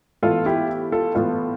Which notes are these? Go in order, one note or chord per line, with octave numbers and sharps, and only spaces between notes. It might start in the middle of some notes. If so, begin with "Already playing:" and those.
A2 E3 B3 F4 A4
E4 G4
F4 A4
A2 E3 B3 F4 A4